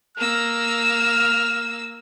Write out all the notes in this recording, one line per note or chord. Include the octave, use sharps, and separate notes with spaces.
A#3 E6 F6